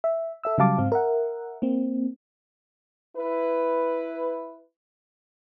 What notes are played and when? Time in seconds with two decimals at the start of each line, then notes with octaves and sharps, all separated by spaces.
0.04 E5
0.44 A4 E5 E6
0.58 C#3 F#3 G3 F5 A5 D6
0.78 G#2 C4 F5
0.92 A#4 E5 F#5
1.62 A#3 C4
3.17 E4 B4